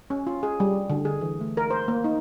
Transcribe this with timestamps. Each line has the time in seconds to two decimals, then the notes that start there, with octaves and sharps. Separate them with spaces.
0.10 C#4
0.27 F4
0.43 G#4
0.60 G3
0.90 D3
1.05 G#4
1.21 E3
1.41 A3
1.57 A#4
1.71 C5
1.88 A#3
2.04 D#4